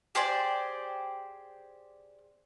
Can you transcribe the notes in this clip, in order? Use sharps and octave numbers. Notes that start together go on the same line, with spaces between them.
G4 G#4 C5 D5